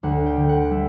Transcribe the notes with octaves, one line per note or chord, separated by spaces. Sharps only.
D2 F#5
G5
D3
F#5
G3 E5